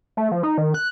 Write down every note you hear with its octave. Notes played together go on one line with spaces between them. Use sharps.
A3
F3
D#4
D#3
F#6